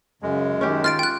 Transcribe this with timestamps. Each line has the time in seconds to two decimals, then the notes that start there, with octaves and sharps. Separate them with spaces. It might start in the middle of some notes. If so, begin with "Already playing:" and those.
0.22 F#2 C#3 G#3
0.61 D#3 C#4 G4
0.84 F4 F6 A6 D7
0.99 G5 F#6